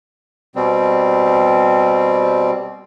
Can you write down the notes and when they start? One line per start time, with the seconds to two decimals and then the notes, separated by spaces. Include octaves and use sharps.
0.56 B2 G3 C4